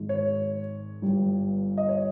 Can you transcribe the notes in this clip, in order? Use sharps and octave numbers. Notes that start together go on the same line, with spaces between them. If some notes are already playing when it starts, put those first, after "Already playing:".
Already playing: G#1 G#2 D#3 G#3
C#5
G1 G2 G3
D#5
C#5